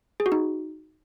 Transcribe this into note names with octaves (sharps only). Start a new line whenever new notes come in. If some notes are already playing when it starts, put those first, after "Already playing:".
G#4
F#4
D#4